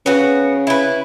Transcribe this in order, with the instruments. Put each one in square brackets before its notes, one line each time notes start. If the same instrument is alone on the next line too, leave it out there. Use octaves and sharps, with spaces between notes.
[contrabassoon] C#3 [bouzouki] B3 F#4
[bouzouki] E4 B4